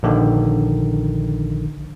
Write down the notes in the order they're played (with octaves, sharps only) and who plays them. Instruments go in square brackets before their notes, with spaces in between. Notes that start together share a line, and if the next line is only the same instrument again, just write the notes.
[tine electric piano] A#1 D3 D#3